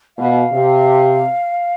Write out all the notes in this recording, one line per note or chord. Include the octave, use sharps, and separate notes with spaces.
B2 F5
C3